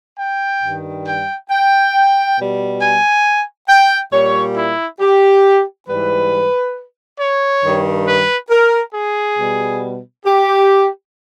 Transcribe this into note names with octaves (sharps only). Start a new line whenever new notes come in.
G5
G2 D#3 G3
G5
G5
B2 G3
G#5
G5
A#2 G3 C#5
E4
G4
G#2 E3 G3 B4
C#5
G2 D#3 G3
B4
A#4
G#4
B2 G3
G4